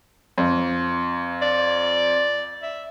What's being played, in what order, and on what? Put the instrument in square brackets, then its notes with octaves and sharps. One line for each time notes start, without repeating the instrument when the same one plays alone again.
[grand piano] F2
[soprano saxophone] D5
E5